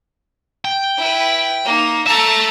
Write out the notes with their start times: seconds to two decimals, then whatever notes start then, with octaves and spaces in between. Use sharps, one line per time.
0.65 G5
0.97 E4 B4
1.65 A#3 D#4
2.06 A4 E5 A5 A#5